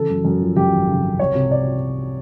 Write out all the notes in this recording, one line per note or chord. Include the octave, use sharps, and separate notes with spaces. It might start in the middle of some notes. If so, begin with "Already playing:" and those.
Already playing: C#3 E3 A4
F#2
F#2
F3
F#2 G4
G#1
C#3
C#3
C2 C#5
C3
D5